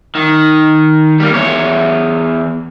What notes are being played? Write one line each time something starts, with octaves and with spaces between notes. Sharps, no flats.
D#3
G3 A#3
E2 C#5